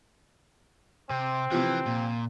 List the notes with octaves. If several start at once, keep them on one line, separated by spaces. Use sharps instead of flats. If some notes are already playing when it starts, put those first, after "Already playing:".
C3 C4
C3 E3 F3
A#2